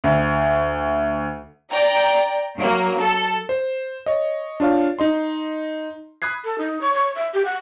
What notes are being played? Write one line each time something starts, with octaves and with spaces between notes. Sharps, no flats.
D2
D5 G5 A#5
F#3 A#3
A4
C5
C#5 D#5
D4 F4 C#5 F5
D#4 D#5 C6
B5 D#6 F#6 G#6 C7
A4
D#4
C#5
C#5
E5
G4
F#5